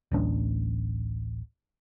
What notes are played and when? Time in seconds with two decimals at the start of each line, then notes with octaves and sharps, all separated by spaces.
0.12 D1 A1 D4